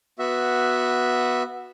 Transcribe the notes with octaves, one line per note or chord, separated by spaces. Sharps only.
B3 F#4 E5